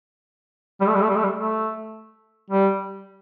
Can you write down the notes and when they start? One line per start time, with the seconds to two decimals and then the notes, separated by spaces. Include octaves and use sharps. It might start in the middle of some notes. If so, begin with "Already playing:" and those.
0.81 G3
0.87 A3
0.94 G3
1.02 A3
1.09 G3
1.16 A3
1.23 G3
1.37 A3
2.50 G3